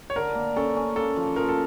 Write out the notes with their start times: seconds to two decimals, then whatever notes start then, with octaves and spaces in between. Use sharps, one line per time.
0.10 C#5
0.16 D3 A#4
0.35 A#3
0.56 C#4 A4
0.76 C#4
0.96 A#3 A4
1.16 F3
1.36 F3 A#4
1.49 A4